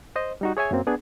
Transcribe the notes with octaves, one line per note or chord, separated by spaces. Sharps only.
C5 D#5
G3 D#4 F#4
G#4 C#5 E5 G#5
F#2 F#3 A#3 C4
B3 D4 G#4